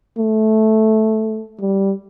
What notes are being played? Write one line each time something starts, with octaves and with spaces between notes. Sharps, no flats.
A3
G3